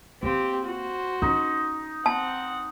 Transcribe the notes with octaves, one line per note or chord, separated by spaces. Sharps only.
A#3 C4 G4
F#4 C5
C#4 D#4
C4 F#5 A5